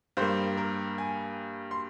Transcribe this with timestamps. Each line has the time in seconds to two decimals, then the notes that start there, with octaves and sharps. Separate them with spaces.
0.17 G2 G3 A#3 C5
0.57 A#4
0.98 G#5
1.71 C6